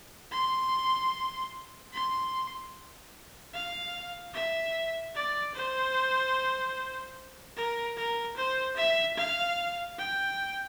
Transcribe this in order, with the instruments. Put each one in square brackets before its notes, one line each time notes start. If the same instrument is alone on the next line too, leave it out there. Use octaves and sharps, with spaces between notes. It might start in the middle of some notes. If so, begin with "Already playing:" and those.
[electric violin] C6
C6
F5
E5
D5
C5
A#4
A#4
C5
E5
F5
G5